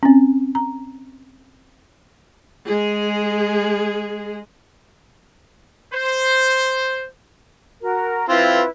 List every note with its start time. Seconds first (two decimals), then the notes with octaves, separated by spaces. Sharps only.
0.03 C4 C#4
0.55 A#5
2.66 G#3 G#4
5.94 C5
7.82 F#4 A#4
8.29 C4 E4 F4 B4